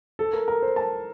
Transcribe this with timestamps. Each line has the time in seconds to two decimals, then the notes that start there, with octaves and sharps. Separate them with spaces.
0.19 A4
0.33 A#4
0.48 A#4
0.62 C5
0.76 A5